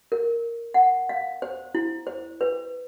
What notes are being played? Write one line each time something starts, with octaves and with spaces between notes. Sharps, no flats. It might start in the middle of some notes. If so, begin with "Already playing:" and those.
A#4
F#5
F5
C5
E4
C5
B4